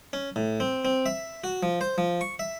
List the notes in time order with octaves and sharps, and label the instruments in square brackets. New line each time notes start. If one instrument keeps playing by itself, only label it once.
[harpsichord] C#4
A2
C4
C4
E5
F#4
F3
C5
F3
C#6
E5